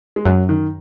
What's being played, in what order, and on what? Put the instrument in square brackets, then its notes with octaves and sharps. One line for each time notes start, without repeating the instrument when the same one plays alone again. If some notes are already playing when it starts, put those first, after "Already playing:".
[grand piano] G#3
[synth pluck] F#2 [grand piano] F#3
[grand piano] D#3